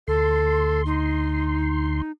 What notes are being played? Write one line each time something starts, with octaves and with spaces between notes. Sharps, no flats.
D2 A4 C6
D#4